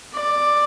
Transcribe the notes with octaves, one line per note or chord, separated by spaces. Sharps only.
D5